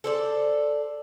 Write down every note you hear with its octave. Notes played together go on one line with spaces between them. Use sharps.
A4 C5 D5